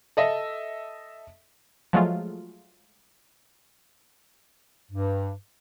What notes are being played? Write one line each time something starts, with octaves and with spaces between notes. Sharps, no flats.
A4 D#5 E5
F3 F#3 G#3 A3 F4
G2